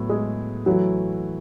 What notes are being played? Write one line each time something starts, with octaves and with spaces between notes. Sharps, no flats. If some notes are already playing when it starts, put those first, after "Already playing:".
Already playing: A2 F#3 B3
G#3 G#4
E3 F#3 A3 E4 F#4